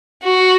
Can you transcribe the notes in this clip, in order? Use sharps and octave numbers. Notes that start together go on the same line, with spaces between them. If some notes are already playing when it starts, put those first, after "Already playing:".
F#4